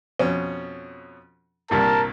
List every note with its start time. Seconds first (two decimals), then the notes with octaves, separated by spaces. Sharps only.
0.19 F2 B2 C#4
1.71 C2 G2 A#2 A#4 A5